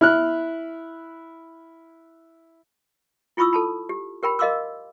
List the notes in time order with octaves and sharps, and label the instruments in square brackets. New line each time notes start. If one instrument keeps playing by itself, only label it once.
[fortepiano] E4 F6 F#6
[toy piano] E4 F4 B5 C#6 D#6 E6
A4 A5 B5
G4
G4 A#4 G5 B5
A#4 D#5 F5 C6 D6 E6